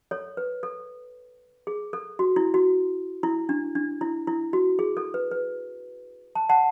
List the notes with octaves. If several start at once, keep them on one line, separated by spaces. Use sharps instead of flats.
A4 C#5
B4
A4
G#4
A4
F#4
E4
F#4
E4
D4
D4
E4
E4
F#4
G#4
A4
B4
B4
A5
F#5 A5